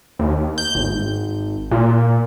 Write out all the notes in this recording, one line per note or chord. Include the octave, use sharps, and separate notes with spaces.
D#2
G6
G#1
A#2